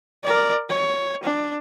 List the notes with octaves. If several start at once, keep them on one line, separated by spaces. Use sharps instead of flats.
A#4 D5
C#5
D4